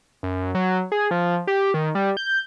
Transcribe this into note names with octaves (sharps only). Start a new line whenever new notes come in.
F#2
F#3
G#4
F3
G4
D#3
G3
G6